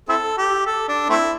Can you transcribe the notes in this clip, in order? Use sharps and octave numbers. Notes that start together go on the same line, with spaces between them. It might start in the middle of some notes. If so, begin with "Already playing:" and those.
C4 E4 A4
G4
A4
D4
A3 C4 E4